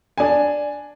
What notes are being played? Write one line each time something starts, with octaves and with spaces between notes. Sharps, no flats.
D4 G#5